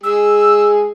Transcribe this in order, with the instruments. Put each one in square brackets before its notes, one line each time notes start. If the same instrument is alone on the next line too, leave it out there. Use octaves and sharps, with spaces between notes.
[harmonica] G#3 G#4 [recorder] E6